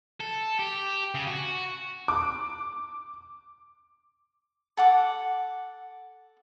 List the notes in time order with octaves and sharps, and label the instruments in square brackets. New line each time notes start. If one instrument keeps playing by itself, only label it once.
[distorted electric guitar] A4
G4
C#3
F#4
[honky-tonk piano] D6
[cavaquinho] A4 F#5 D6